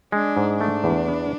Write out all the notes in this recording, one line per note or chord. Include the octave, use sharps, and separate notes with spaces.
G#3 D4
G#2
A3 D4
E2
B3